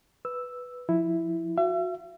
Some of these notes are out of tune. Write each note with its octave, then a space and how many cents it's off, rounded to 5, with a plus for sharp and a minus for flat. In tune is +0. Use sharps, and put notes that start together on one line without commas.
B4 +0 E6 +0
F3 +0 E4 +0
F#4 -20 E5 +40